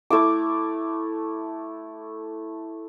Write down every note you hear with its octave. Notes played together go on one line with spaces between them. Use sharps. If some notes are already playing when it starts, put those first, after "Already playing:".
A3 E4 D6